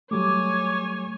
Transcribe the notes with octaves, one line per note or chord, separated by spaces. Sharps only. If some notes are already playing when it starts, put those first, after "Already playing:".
F#3 G3 A3 C#5 G#5 D6